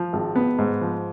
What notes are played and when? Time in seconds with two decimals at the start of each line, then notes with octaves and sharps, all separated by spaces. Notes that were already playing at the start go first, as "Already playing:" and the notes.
Already playing: F3
0.13 G#1
0.36 B3
0.59 G#2
0.81 F3